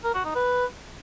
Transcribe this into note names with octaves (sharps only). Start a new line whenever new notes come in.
A#4
F#4
D#4
B4